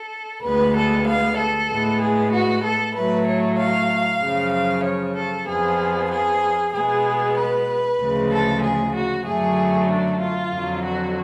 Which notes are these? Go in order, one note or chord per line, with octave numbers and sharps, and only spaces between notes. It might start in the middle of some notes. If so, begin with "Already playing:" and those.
Already playing: A4
D2 D3 G#3 B3 B4
A4
F5
A4
A2 G#3 B3
G#4
F#4
A4
A2 F#3 A3 B4
C#5
F5
F#2 C#3 F3
F5
C#5
A4
F2 F3 B3 G#4
G#4
B2 G#3 B3 G#4
B4
D2 C#3 F3 G#3
A4
G#4
F#4
F#2 D3 F#3 A3 G#4
D4
F4
F2 D3 F#3
F#4